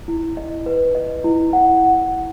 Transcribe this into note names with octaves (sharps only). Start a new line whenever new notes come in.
E4
D#5
B4
D#5
E4
F#5